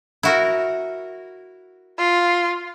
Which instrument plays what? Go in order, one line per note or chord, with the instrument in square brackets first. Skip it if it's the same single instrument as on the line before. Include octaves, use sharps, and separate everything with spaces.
[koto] E4 F#4 A#4
[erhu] F4